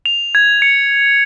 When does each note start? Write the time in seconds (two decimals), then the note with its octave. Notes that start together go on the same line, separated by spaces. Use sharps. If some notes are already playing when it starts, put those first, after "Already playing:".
0.06 F7
0.35 G#6
0.62 C#7